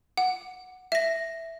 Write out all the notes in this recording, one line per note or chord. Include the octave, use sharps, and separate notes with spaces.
F#5
E5 A#6